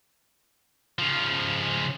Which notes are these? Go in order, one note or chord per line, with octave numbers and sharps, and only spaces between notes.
C#3 F3